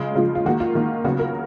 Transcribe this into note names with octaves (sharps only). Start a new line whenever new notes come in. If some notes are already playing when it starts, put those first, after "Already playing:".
Already playing: C#3 F3 G#3
C#3 F3 G#3 F4
F4
D#3 A#3 F#4
F4
D#3 A#3
C#3 F#3 B3 F#4
A#4